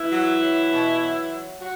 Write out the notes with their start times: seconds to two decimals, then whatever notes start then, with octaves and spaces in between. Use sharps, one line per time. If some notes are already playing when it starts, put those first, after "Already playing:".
Already playing: E3 E4
0.12 F#3
0.42 F#3
0.71 B2
1.01 F#3
1.31 F#3
1.60 F#3 F#4